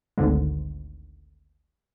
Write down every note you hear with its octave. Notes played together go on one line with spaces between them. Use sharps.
G#1 D2 G#2 D3 G#3